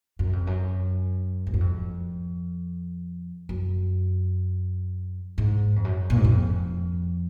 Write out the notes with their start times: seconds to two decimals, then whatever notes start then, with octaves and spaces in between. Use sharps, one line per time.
0.19 F#2
0.33 F2
0.47 F#2
1.47 G#2
1.54 F#2
1.60 F2
3.49 F#2
5.38 G#2
5.76 F2
5.84 F#2
6.10 A#2
6.17 G#2
6.24 F#2
6.32 F2